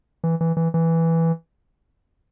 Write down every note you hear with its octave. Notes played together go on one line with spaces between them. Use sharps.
E3
E3
E3
E3